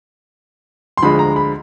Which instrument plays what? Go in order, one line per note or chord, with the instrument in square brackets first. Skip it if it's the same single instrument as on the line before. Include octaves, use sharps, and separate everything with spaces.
[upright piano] C6
D2 D3 F3 G#3 B5
A#5
B5